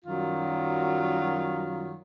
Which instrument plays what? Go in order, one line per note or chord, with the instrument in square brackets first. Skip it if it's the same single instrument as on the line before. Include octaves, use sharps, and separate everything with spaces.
[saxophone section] F#2 D#3 F#3 G3 F4